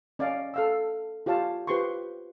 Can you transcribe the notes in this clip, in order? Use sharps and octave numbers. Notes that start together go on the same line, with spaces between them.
C#4 D5 D#5 F5
A4 F5 E6
F4 G4 C#5 F5 A5
F4 G4 B4 C5 C6 C#6